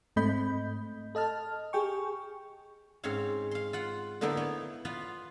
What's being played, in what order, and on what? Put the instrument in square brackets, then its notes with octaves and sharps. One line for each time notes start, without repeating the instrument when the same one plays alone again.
[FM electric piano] G#2 A3 C4 D#5 B5 G6
A4 D#5 A5 F6
G4 G#4 G5 C#6
[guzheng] G#2 C4 C#4 C#5 F5
F5 C6
F4 F#5
D3 A#3 B3 D#4 E4
B3 C#5
B3 F4 B4 F5